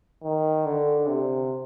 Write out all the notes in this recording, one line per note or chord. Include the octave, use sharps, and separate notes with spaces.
D#3
D3
C3